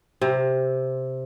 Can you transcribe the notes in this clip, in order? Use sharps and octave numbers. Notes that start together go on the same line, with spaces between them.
C3